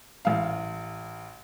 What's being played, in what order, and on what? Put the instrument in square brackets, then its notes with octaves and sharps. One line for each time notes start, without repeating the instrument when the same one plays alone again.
[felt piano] A1 F5